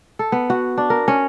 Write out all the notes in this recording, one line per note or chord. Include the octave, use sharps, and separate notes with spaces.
A4
B3
F#4
D4
A#4
C#4